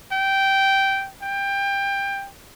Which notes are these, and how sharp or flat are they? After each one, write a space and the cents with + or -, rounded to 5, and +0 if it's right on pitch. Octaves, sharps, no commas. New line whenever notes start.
G5 -10
G5 +20